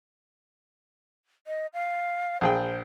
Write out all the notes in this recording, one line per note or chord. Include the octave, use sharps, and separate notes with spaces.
D#5
F5
A#1 G#4 C5 G5